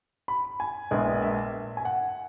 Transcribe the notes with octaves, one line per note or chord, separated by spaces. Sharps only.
B5
G#5
A#1 A#2 G#3 B3
E5
G#5
F#5